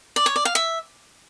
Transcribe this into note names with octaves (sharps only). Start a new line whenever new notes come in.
D5
C#5
D5
F5
E5